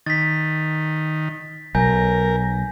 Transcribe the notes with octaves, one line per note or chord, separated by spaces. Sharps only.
D#3 A6 B6
B1 A#4 G#5 G6 A#6